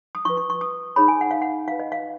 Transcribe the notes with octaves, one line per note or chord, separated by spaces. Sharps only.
D#6
F4 B4 C#6
C#6
C#6
D#6
D#4 G#4 C#5 B5
G#5
F#5
F5
F#5
F4 B4 F5
D#5
F5